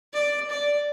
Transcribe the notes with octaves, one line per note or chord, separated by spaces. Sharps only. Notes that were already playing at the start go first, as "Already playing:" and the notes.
D5
D5